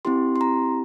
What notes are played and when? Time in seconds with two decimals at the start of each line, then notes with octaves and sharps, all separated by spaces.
0.05 C4 E4 G4 C6
0.36 C6
0.41 A#5